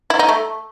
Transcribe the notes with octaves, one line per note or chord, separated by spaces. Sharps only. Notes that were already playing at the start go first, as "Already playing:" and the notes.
E4
D#4
A3